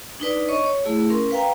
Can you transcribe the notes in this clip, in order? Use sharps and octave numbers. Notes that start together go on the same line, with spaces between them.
D4 D#4 B4 D5
C#5 D#5 C#6
C#5
A3 E4 G#4
C#4 A#4 C6
B4 F5 G5 A#5